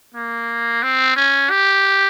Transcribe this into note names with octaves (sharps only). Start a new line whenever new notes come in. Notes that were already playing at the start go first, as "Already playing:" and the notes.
A#3
C4
C#4
G4